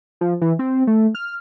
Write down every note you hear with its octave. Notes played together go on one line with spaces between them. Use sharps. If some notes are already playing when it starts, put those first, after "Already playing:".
F3
E3
C4
A3
F6